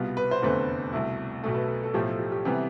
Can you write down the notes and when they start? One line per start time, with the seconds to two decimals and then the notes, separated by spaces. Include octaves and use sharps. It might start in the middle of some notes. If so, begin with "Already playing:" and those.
Already playing: C2 B2 G3 B3 F4
0.17 B4
0.31 C5
0.42 F1 E2 D3 A3 C4 B4
0.93 C2 B2 A3 E4
1.43 B1 B2 A3 A4
1.55 B4
1.64 A4
1.84 A4
1.94 B1 A2 F3 A3 G4
2.09 A4
2.19 G4
2.32 G4
2.45 C3 E3 G3 B3